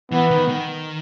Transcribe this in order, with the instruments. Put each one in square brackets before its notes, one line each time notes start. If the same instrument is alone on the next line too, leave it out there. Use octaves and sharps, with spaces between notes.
[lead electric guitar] E3 [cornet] B3
[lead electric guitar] D#3
D#3